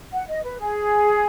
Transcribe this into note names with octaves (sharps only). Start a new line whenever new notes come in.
F#5
D#5
B4
G#4